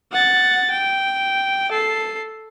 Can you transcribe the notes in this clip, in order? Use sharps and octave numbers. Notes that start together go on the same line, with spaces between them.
F#5 A6
G5
A4 C7